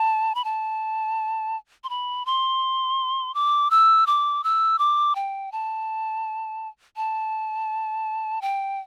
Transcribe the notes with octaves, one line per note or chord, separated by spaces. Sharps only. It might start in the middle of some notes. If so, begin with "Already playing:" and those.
Already playing: A5
B5
A5
C6
B5
C6
D6
E6
D6
E6
D6
G5
A5
A5
G5